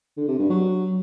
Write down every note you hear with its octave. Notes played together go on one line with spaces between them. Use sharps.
D3
C3
G2
F#3